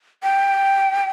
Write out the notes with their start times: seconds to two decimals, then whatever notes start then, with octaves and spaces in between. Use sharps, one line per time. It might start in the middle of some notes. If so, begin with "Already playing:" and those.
0.23 G5